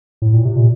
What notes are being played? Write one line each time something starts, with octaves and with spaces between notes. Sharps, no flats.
A2
A#2
C3
A#2